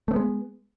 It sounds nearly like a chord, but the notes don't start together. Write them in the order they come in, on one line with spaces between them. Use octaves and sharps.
A3 C4 B3 G#3